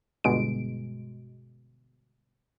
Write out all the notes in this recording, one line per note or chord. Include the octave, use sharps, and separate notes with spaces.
G1 B2 G#3 D7